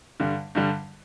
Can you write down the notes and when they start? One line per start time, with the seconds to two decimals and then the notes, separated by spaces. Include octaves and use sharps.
0.20 G2 D3 G3
0.55 G2 D3 G3